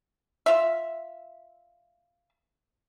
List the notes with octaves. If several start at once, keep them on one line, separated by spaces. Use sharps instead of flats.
F4 E5